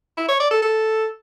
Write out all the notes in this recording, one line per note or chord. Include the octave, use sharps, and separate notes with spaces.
E4
C#5
D5
A4
A4